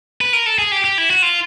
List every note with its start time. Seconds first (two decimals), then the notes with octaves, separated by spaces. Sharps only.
0.21 B4
0.33 A#4
0.46 A4
0.58 G#4
0.72 G4
0.84 G4
0.98 E4
1.10 F#4
1.22 F4